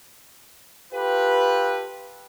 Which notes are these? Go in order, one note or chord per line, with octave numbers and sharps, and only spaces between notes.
F4 G4 A4 B4